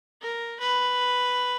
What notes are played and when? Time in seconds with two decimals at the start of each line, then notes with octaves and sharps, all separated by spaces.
0.21 A#4
0.59 B4